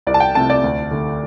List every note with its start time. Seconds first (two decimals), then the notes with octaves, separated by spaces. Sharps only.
0.07 C2 D5
0.14 A5
0.20 G5
0.35 C3 A3 A5
0.50 D5
0.64 D2
0.91 D3 A3